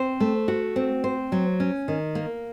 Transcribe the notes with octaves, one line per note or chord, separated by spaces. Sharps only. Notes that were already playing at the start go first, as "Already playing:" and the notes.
Already playing: C4 C5
A3
F#4
C4
C5
F#3
C#4
D#3
A#3